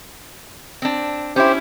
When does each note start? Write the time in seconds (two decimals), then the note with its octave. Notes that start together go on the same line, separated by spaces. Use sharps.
0.82 C4 D4
1.36 C#4 E4 G4 C5